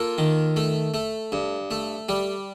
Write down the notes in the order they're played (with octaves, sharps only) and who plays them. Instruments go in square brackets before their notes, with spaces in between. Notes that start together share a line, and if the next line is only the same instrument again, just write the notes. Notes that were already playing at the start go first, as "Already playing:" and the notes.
Already playing: [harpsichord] A#3 F4 A4
D#3
A3
A3
G2
A3
G3